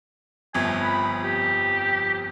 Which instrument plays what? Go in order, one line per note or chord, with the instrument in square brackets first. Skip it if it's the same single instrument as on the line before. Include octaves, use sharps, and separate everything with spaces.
[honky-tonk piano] G1 F2 [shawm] G#5
[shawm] B5
G4